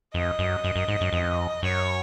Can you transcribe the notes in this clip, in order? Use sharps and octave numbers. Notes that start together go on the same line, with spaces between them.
F2 D#5
F#2
F#2
F#2
G#2
F#2
F2
F#2 C#5